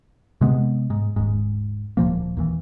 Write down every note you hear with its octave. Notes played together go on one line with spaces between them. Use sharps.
C3 G#3 B3
G#2
D#1 G#2
D1 A#2 F3 A#3
A#1 D#2 E3